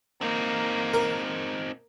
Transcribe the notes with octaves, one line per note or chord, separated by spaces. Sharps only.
A#3 C4 D#4
A#4